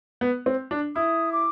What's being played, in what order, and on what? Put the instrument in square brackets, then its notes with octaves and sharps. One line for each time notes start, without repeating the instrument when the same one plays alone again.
[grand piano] B3
C4
D4
[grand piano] E4 [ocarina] D#6
[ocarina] D6